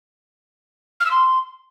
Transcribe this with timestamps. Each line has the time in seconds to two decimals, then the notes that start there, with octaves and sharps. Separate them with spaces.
1.00 F6
1.05 E6
1.11 C6